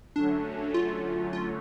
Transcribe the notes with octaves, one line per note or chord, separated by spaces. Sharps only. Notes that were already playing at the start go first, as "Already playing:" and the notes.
D3 F#3 A3 C#4 D4
F4
F4